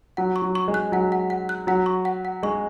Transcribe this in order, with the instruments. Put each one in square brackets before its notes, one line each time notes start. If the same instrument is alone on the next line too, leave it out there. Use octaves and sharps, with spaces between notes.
[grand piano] F#3 [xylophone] F#5
[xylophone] C#6
[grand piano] F#3
[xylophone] C#6
[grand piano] G#3
[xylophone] F#6
[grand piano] F#3 [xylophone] F#5
[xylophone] F#5
F#5
F#6
[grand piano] F#3 [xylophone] F#5
[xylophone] C#6
F#5
F#5
[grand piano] G#3 [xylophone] C#6